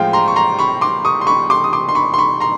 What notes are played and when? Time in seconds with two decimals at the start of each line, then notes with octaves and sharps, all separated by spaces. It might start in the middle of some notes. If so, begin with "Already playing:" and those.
Already playing: A2 F3 G#3 F5 G5
0.13 A#5 C6
0.28 C#6
0.36 A#5 C6
0.59 B5 C#6
0.81 C6 D6
1.05 C#6 D#6
1.21 C6
1.27 B5 C#6
1.50 C6 D6
1.64 D#6
1.73 C6 D6
1.89 C6
1.95 B5 C#6
2.14 C6
2.18 B5 C#6
2.40 A#5 C6